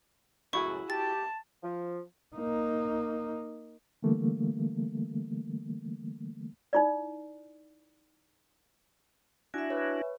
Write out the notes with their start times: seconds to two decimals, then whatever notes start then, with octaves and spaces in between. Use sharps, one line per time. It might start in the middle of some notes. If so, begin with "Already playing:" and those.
0.53 C#2 F#2 A2 E4 F#4 G#4 C#6
0.90 G4 A5 A6
1.63 F3
2.36 A#3 D#4
4.03 D3 E3 G3 A3 A#3
6.73 D#4 E4 D5
9.54 D4 E4 F#4 E5 G#5
9.70 B4 C#5